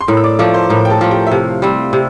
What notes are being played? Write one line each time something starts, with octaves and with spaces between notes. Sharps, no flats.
C6
A2 A#4 A#5
E6
D5 D6
F3 A3 D5 D6
C5 C6
A2 A#4 A#5
G5
A4 A5
F3 A3
G4 G5
E5
C3 F5
G3 C4
C3